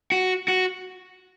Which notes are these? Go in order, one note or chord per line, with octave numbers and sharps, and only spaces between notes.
F#4
F#4